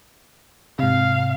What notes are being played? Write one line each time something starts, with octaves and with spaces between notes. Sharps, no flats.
G#2 C3 F5